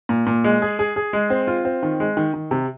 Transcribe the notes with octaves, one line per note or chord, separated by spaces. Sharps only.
A#2
A#2
G#3
G#4
G#4
G#4
G#3
C4
F4
C4
D#3
G#3
D#3
D#3
C3